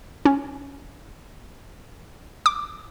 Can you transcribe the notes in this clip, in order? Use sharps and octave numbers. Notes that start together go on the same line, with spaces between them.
C#4
D6